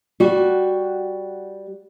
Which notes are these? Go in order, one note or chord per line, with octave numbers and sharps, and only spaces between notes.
G3 F#4